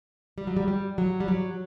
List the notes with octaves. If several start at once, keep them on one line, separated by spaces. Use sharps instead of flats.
G3
F#3
G3
G3
F#3
G3
F#3